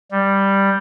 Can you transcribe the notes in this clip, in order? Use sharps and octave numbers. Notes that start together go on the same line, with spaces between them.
G3